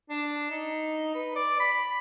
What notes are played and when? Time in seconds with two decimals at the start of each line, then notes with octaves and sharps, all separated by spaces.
0.10 D4
0.50 D#4
1.15 B4
1.36 D5
1.60 B5